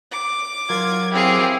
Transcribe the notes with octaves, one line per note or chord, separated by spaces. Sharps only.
D6
F#3 F4 A#4 G#6
C4 E4 G4 G#4 F5